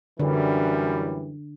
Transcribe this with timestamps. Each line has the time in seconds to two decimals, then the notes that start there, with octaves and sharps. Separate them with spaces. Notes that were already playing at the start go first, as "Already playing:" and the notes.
0.20 F#2 D3 E3 G3